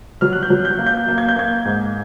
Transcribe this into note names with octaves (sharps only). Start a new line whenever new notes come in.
F#3 F6
F#6
G6
F#3
G6
A#3
G6
A#3
G#6
G6
A#3 G#6
G#2